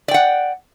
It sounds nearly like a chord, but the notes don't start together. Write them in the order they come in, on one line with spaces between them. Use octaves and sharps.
D5 G5 F#5